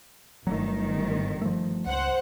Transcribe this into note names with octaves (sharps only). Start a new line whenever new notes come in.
G1 D#3 F#3 A3
F3 A3
C#2 C5 F#5